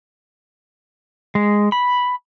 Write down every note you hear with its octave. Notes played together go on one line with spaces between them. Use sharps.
G#3
B5